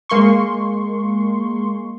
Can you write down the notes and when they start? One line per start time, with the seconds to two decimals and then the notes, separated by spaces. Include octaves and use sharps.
0.09 G#3 A#3 C6 C#6